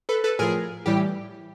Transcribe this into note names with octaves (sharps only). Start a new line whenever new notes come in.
A4 B4
A4 B4
A2 F3 G#4 A#4
A2 E3 G3 G4